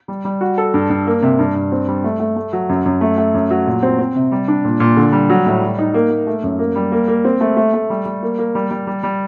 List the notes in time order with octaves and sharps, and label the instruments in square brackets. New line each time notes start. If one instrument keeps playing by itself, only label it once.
[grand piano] G3
G3
F#4
A4
G2
G2
A#3
C3
G2
G2
C4
G3
A3
A3
A3
F#3
F#2
F#2
A3
A3
F#2
F#3
A#2
C4
C4
C3
G3
D4
A#2
A#2
D3
G3
F#3
A2
G3
D#4
A#3
A#3
A3
F#2
A#3
G3
A#3
A#3
C4
A3
A3
A3
G3
G3
A#3
A#3
G3
G3
G3
G3